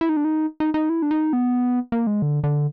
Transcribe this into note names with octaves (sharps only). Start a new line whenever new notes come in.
E4
D#4
D4
D#4
D#4
D#4
E4
D4
D#4
B3
A#3
G#3
D3
D3